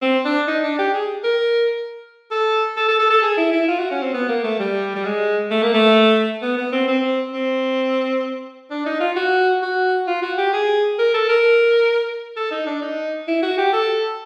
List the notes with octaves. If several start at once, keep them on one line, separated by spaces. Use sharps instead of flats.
C4
D4
D#4
D4
G4
G#4
A#4
A4
A4
A4
A4
A4
G#4
E4
E4
F4
F#4
C#4
C4
B3
A#3
A3
G3
G3
G#3
A3
A#3
A3
B3
B3
C4
C4
C4
D4
D#4
F4
F#4
F#4
F4
F#4
G4
G#4
A#4
A4
A#4
A4
D#4
D4
D#4
E4
F#4
G4
A4